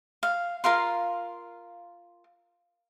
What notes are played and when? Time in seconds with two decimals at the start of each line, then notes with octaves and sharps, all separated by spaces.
0.23 F5
0.64 F4 A#4 F5 C6